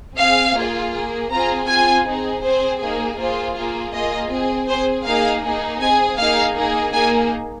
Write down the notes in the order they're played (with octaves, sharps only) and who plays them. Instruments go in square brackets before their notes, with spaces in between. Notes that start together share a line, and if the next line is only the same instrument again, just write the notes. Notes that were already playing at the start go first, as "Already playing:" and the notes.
[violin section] C4 G#4 F5
A#3 F4 G#4
A#3 G#4
C4 F4 G#4 A#5
C4 F4 G#4 G#5
C4 D#4 G#4
C4 G#4 C5
A#3 D#4 G#4
A#3 F4 G#4 C5
A#3 F4 G#4
A#3 F4 G#4 D#5
C4 G#4
C4 G#4 C5
A#3 D#4 G#4 F5
A#3 D#4 G#4
C4 G#4 G#5
A#3 D#4 G#4 F5
A#3 D#4 G#4
A#3 D#4 G#4 G#5